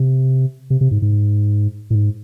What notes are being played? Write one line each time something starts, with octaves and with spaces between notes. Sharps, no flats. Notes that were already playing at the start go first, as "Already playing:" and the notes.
Already playing: C3
C3
C3
G#2
G#2
A2
G#2